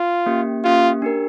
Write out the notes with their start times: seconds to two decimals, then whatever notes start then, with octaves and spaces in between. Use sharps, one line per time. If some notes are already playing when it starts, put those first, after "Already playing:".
Already playing: F4
0.26 A#3 C#4 G4
0.64 A#3 C#4 F4 G4
1.02 D4 G4 A#4